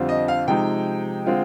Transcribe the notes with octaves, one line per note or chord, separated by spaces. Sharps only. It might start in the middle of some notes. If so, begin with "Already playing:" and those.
Already playing: F2 D3 G3 C4 F4
D#5
F5
C3 F3 G#3 D#4 G5
D3 G#3 C4 F4